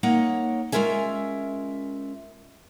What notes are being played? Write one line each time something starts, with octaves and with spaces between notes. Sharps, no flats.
A#3 D#4 C#5 F#5
G#3 C#4 F4 A#4 E5 G#5